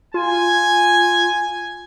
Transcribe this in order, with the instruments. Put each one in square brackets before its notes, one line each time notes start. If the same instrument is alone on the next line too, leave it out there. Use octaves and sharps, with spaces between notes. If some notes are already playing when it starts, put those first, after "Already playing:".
[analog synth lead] F4 [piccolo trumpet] G#5